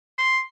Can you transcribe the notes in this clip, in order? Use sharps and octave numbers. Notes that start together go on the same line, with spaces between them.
C6